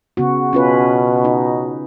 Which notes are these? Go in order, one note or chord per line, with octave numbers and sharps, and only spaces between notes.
C#3 B3 F#4
B2 C#4 F4 B4
D#4